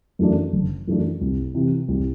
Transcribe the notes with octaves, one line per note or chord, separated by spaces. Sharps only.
F#2 E3 A3 D4
F#1
F#2 E3 A3 D4
C2
C3 E3
C2